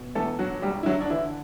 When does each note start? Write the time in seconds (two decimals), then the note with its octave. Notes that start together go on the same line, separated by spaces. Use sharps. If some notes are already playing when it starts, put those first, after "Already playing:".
Already playing: B2
0.15 E2 A3 A4
0.39 F#3 F#4
0.62 E1 G3 G4
0.83 E4
0.86 D3 F#3 F#4
1.01 D4
1.10 D3 E3 E4